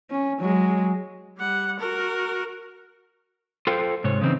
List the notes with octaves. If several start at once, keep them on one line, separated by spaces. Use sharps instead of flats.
C#4
F#3 G#3
G3 F#5
F#4 A#4
F4 A4 C5 F5 G5
G#2 C3 C#5
C#3 E3 C4 D#4